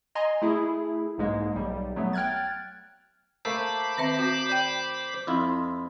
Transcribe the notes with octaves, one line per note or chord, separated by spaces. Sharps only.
D#5 G#5 A#5 C6
A3 E4 G#4
B1 G#2 G#3 A#3
B1 G3
F#3 A3 B3
G5 F6 F#6 G#6 A6
A3 A#3 A4 C5 B5 D6
D#3 C4 E5
C4 F#4
D5 G5
F2 E4 F4